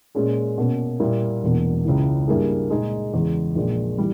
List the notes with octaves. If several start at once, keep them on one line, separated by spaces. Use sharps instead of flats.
A#2 G#3 C#4 G#4
B2 A#3 C#4
A#2 G3 A#3 E4 G4
E1 E2 B2 A#3
C#2 C#3 E3
G2 G3 A#3 E4 G#4
A#2 G#3 D#4 G#4
E2 C#3 G#3
A#1 A#2 G#3
E3 G3